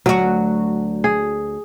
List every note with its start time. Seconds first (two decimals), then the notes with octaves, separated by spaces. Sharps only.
0.06 D2 F#3 F#4
1.04 G#4